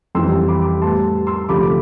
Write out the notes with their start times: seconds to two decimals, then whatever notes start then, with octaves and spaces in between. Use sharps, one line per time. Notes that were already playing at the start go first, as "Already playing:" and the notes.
0.15 F2 E3 G3 C6 E6
0.48 B5 D6
0.82 A2 G3 B3 A5 C6
1.27 C6 E6
1.49 D2 C3 F3 A3 B5 D6